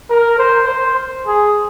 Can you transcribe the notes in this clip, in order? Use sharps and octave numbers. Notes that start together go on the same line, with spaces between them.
A#4
C5
C5
G#4